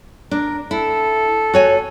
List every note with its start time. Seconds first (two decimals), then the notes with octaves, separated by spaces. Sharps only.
0.31 D4 A#4
0.71 E4 A4
1.54 F#4 C#5 G#5